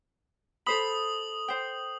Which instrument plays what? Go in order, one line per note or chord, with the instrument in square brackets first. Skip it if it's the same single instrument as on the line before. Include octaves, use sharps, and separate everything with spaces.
[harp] A4 C5 B5 [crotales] D#6 F#7
[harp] C5 G5